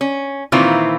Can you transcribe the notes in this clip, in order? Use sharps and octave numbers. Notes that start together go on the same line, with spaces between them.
C#4
A#2 D#3 E3 C4 E4 F4